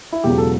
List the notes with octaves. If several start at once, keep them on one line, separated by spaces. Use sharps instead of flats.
E4
E1 E2 C#3 F#3 G4
A4